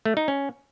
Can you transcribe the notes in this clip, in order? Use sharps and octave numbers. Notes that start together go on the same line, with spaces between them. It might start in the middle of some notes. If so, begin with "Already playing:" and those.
A3
D#4
C#4